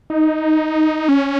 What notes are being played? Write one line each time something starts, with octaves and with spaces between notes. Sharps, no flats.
D#4
C#4